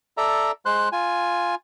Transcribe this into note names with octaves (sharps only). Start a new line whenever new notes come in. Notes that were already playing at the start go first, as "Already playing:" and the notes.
A4 D5 E5 A#5
G#3 C5 C6 F#6
F4 G#5